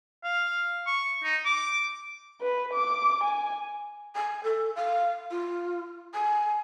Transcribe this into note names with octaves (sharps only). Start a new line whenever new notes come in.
F5
C#6
D#4
D6
B4
D6
G#5
G#5
A4
F5
F4
G#5